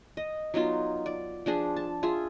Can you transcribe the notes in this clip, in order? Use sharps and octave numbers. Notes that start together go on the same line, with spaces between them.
D#5
F#3 B3 D#4 F4
D5
F3 D4 G#4
A5
F4 G#4 E5